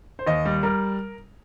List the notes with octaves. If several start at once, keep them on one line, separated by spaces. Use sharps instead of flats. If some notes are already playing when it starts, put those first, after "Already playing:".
C5
D#2 D#5
G3
G3 A#4